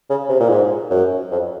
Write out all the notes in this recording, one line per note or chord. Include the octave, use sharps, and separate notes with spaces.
C#3
C3
A#2
G#2
F#2
F2